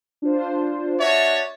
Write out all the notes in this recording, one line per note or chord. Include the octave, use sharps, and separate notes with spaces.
D4 F4 C5
D4 F#4 C#5 E5 A6